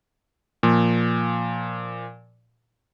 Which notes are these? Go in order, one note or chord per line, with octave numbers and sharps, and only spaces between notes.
A#2 F3